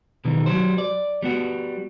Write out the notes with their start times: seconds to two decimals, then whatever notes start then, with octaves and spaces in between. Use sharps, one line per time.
0.25 B2 D#3 E3 G3
0.46 F#3 G3 C5
0.78 D5
1.22 G3 B3 F#4